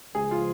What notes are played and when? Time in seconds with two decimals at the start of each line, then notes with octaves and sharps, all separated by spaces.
0.15 C#2 C#3 F3 G#4
0.31 F4